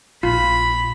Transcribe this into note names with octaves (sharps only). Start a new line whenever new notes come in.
A#1 A#2 F4 B5